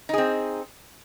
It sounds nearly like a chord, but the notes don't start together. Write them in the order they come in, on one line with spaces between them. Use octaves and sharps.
D#4 G#4 C4